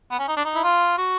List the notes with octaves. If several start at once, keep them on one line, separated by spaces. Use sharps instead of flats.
B3
C#4
D#4
D4
D#4
E4
F4
F#4